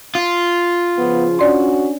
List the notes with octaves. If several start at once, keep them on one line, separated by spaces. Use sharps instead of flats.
F4
C#3 F3 B3
C#4 D4 F#4 D5 C6